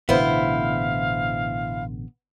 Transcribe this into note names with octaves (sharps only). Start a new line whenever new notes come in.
A1 B2 D3 B3 E4 C5 F5